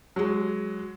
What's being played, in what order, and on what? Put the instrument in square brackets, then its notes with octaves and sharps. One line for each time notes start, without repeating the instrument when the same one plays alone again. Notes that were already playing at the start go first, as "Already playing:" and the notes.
[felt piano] F#3 G#3